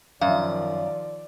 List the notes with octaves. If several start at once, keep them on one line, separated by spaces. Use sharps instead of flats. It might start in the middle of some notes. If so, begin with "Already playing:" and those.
F#2 D#3 F3 D5 F5